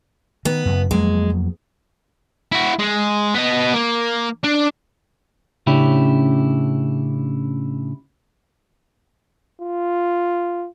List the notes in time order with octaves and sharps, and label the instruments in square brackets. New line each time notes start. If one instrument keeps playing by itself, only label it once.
[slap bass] D#3 [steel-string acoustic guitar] B3
[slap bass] F#2 C#3
[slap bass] F2 F#3 A#3 [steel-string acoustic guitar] G#3
[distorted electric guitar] E4 F#4
G#3
B3 D#5
A#3
D4
[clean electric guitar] A2 C#3 C#4 D4 E4 G4
[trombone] F4